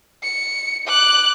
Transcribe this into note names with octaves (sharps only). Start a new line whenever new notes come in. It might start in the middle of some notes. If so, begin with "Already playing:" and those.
C#7
D6 F#6